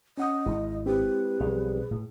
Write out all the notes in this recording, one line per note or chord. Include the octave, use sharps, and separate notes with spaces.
C#4 D#5 F#5 D#6
G#1 G#3 E4
C4 G4 B4
B1 F3 G3 G#4
A2